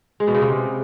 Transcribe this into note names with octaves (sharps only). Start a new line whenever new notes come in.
G#3
B2
C#3
C3